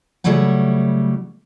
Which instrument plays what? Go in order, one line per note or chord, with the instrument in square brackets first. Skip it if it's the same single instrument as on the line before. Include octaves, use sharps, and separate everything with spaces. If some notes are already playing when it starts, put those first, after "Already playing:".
[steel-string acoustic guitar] C#3 F#3 G3 A3 E4 F#5